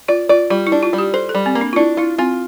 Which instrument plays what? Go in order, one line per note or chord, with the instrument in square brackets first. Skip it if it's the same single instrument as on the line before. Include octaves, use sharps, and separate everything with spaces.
[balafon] F4 [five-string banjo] D5
[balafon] F4 [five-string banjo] D5
[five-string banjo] G3 [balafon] F4
[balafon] E4
[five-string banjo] D4
[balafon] F4
[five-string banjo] G3
[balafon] G4
[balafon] A4 [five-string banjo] C5
[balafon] A4
[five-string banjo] G3
[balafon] C4
[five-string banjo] A#3
[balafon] D4
F4
[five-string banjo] D4 [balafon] E4
[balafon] E4 [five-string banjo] F4
[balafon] C4 [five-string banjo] F4